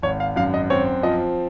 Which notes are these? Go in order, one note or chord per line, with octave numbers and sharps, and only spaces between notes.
G#1 C#5
F5
F#2 F5
D#5
C4 C#5
F3 D#5